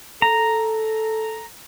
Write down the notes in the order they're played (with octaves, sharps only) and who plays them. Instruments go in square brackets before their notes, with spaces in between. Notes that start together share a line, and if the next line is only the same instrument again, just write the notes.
[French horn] A4 [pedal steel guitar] A#5